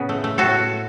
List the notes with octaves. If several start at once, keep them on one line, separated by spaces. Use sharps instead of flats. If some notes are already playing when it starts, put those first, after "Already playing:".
Already playing: A2 C#3 B3
A3
A3
A2 F#4 A4